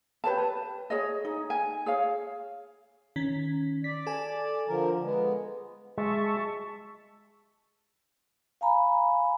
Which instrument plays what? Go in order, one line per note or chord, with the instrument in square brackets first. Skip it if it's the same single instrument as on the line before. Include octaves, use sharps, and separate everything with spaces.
[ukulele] G4 B4 C#5 A5
B4
G#4 C#5 D#5
D#4 G#4
G#5
G#4 C#5 F5
[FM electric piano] D#3 C#4 B6
[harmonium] D5 [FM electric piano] B6
[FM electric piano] A4 G#5
[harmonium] D3 F3 A#4
G#3 B3
[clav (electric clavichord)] G#3 [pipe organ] E5 A5 C#6
[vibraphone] F5 G#5 A#5 B5